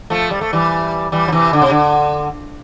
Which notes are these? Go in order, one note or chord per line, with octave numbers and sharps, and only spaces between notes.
F3 A3
G3
A3
E3 G3
E3 G3
F3
C3 E3
D3
C3
D3